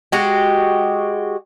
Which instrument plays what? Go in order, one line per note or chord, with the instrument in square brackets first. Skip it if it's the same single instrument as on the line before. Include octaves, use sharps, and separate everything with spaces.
[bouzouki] G#3 F#4 G4